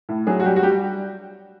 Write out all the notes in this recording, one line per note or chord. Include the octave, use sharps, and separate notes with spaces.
A2
F#3 G#4
F#4
G3 G4
F#4
G3 G4